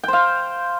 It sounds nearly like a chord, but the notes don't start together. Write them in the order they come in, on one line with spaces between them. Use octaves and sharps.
G5 C5 F5